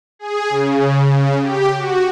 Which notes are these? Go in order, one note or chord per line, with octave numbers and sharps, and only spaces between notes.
G#4
C#3
G4
F#4